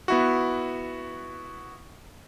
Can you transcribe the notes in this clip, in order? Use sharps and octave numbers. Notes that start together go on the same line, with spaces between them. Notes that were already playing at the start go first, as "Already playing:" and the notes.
B3 E4 F#4